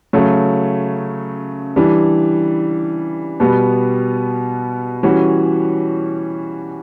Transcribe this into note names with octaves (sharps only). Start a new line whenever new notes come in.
C#3 F#3 A3
E3 G3 D4
B2 G3 B3
E3 G3 C#4 F#4